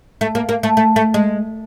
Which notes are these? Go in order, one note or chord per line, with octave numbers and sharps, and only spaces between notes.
A3
A#3
A#3
A3
A3
A3
G#3